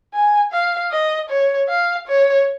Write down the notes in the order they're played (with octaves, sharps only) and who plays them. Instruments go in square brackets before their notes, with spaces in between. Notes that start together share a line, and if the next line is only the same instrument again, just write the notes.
[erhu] G#5
F5
D#5
C#5
F5
C#5